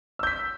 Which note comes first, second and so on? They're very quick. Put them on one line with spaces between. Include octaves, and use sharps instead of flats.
E6 G6 B6